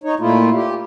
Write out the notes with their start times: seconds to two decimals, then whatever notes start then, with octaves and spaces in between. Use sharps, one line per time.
0.04 D#4 C#5
0.19 A#2 A3 A#3 E4 F4
0.54 G4